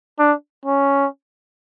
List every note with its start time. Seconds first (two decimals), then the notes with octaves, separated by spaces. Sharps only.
0.19 D4
0.65 C#4